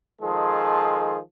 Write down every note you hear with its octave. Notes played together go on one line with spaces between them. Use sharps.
D#3 F3 G#3 G#4 A4